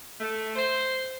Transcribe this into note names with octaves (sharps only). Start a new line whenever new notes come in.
A3
C5